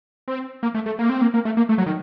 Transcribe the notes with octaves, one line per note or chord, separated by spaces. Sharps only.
C4
A#3
A3
A3
A#3
C4
A#3
A#3
A3
A#3
A3
F#3
D#3